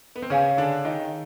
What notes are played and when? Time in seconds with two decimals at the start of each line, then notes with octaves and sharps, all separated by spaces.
0.16 B3
0.22 C4
0.30 C#3 C#4 G#4 C#5 F5 G#5
0.57 D3 D4
0.85 D#3 D#4